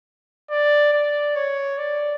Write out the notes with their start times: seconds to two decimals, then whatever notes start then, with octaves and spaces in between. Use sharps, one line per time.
0.50 D5
0.92 D5
1.35 C#5
1.77 D5